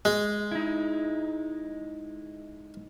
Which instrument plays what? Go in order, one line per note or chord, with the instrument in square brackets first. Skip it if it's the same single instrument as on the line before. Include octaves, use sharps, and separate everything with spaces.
[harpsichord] G#3
[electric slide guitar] D#4 E4